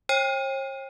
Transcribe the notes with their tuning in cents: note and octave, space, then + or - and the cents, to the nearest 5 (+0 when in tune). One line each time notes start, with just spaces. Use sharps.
C#5 -45 G5 +30